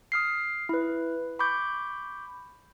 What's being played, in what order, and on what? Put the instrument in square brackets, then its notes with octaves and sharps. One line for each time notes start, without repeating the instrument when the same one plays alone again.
[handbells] D#6 F6 C7
E4 B4
B5 C#6 D6 G6